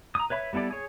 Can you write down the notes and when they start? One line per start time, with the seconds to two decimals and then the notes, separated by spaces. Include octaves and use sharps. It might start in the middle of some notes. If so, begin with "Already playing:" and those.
0.15 A#5 D#6
0.30 B4 C#5 E5 B5
0.53 G3 B3 E4 A4 D5
0.70 G#4 C#5